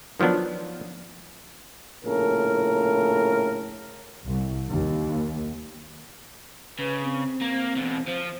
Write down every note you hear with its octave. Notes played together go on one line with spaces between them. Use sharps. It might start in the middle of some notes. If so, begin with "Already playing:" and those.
D#3 F3 F#3 B3 D4
A#1 A2 C#3 A4 A#4
C2
D#2
C#3 B4
C4
A#3
E2 B2
F3 C5